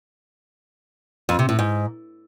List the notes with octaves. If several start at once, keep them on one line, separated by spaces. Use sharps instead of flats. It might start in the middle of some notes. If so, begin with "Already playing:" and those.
F2
C3
A2
G#2